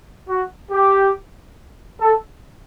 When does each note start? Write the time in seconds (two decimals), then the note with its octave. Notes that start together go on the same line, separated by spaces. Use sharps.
0.29 F#4
0.71 G4
2.00 A4